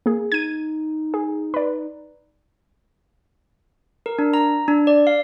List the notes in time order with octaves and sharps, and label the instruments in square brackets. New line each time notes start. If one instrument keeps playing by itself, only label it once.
[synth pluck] A#3 G#4
[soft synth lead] D#4 [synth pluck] G#6 D#7
[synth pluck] G#4
B4 D5
[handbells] A#4
D4
A#5
D4
D5
F5